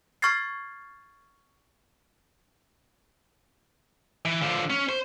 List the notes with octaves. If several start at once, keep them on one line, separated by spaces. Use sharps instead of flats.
C#6 F6 G#6 A6 C7
E3
D3 F3
C#4
C5